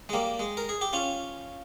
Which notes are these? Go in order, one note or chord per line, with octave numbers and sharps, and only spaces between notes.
G#3
G3 A#3
G#3
A#4
G#4
G4
C#4 F4